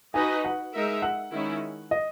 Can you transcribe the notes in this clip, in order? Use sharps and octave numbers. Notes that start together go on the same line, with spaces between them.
D#4 F#4 B4 D#5 G#5
F#5
G#3 D#4 A#4 E5
F#5
D#3 G#3 C#4 E4
D#5